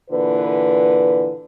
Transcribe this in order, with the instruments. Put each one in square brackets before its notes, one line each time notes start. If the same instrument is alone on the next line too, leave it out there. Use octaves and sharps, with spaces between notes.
[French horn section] A#2 D3 E3 B4